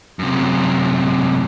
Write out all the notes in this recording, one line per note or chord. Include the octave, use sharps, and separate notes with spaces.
F#2 C3